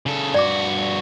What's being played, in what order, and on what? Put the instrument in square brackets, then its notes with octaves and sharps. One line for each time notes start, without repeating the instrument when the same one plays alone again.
[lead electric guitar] C#3 A4
[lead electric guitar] G2 F#4 [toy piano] D5 D6